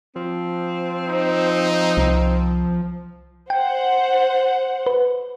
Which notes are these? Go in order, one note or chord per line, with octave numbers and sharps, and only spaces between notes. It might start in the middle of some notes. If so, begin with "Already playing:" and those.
F3 C4
D#4
C2
C5 F#5 G5
B4